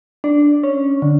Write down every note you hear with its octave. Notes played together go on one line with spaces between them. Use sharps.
D4
C#4
D3